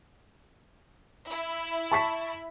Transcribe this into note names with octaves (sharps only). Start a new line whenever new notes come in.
E4
A5 C#6 B6